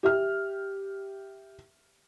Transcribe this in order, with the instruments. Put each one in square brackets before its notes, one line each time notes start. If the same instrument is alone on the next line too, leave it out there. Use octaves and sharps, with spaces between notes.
[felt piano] G4 E5 F6